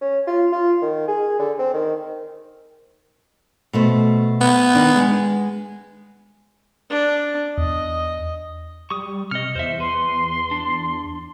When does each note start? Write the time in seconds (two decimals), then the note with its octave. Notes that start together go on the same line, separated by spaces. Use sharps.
0.02 C#4
0.27 F4
0.52 F4
0.82 D#3
1.08 G#4
1.40 D3
1.59 C4
1.74 D#3
3.73 B2 A3 C5
4.41 B3
4.75 D#3 D4
4.96 G#3
6.90 D4
7.58 E2 D#5
8.90 G3 C#6 D#6
9.31 C3 D#5 F6 C#7
9.55 E2 C5 E5
9.80 B4 C6
10.51 D4